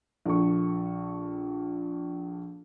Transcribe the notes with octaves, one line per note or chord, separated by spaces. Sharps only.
A#1 A4 C#6